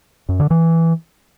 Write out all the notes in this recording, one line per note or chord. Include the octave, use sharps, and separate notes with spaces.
F#2
D3
E3